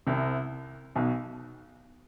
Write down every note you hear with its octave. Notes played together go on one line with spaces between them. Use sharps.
C2 C3
B1 B2